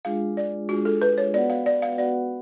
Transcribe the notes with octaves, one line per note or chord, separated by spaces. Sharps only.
G#3 D4 F4 G#4 F5
D5
G#3 D4 F4 F#4 G#4
A4
B4
C#5
B3 F#4 B4 D5 F#5
F5
D5
F5
B3 F#4 B4 D5 F#5